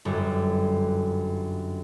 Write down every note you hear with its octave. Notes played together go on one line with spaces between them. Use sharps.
G1 F#2